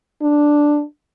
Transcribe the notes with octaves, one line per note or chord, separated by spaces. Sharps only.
D4